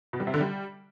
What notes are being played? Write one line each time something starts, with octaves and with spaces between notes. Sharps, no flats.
B2
G3
C3
D3
G3